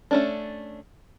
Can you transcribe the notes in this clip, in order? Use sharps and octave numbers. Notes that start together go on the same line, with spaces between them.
A3 C#4 D4